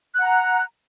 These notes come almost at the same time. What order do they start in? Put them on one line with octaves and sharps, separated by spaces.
F#6 F#5 A#5